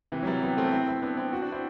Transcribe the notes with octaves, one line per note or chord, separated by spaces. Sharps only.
C3 E3
F#3
E3 G3
G3 B3
A3 C4
C4 E4
C4 E4
B3 D4
C4 E4
D4 F#4
D4 F#4
C4 E4